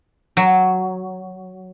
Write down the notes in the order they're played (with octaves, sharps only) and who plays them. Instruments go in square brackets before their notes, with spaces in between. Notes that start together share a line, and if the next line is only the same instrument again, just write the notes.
[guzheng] F#3